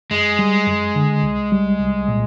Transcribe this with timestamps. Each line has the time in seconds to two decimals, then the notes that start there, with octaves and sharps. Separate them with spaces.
0.11 F#2 G#3
0.39 G3
0.67 F#2
0.95 D3
1.23 C2
1.52 G3
1.80 C2
2.08 A#2